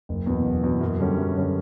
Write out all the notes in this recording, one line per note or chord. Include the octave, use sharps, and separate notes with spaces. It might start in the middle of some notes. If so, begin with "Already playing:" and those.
F#1
E2 B2
F#1
E2 B2
F#2
D3 G3 C#4
F#2
D3 G3 C#4